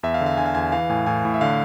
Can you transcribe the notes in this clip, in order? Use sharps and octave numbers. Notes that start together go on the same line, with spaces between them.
E2 E5
F5
D3
F5
D3 G#5
F5
E2 G#5
E3 F5
A2 G#5
A2 G#5
A2
E5
D3 F5